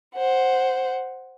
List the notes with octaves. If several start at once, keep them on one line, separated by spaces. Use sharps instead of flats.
C5 F#5